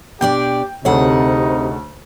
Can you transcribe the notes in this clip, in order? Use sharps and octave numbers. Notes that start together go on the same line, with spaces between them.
B2 D4 G4 D5 G5
D2 C3 A3 D#4 G#4 A4 C#5 F#5